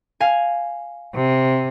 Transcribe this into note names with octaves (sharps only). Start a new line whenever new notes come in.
F5 G#5
C3